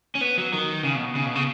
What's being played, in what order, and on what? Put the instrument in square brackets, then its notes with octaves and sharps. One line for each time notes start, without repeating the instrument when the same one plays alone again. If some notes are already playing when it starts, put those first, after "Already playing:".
[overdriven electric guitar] C#4
B3
F#3
D#3
C#3
B2
C#3
B2
C#3